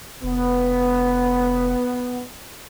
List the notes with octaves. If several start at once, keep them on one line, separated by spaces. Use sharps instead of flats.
F1 B3